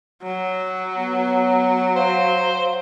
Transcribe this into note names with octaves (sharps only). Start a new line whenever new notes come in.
F#3
B3
C5 F5